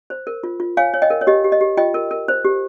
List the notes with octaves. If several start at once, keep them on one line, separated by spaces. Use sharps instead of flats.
C5
A#4
F4
F4
C#5 F5 G#5
C#5
D#5 G5
A#4
C#5
G4 D#5
G4
D#5
G4
F4 D#5 G5
A#4
A#4
C5
G4